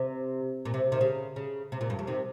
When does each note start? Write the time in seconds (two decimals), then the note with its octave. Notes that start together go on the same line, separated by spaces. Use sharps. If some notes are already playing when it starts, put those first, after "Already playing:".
Already playing: C3
0.65 A#2
0.74 C3
0.92 C3 D#3
1.01 C#3
1.36 C#3
1.72 C3
1.81 A#2
1.90 G2
1.99 F2
2.07 C3 D#3